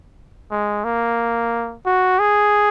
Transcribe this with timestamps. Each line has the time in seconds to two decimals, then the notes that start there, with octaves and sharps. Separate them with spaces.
0.51 G#3
0.84 A#3
1.85 F#4
2.19 G#4